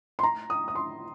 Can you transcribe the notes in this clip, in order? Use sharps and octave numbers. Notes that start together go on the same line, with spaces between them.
C6
A#5
D#6
D#6
C6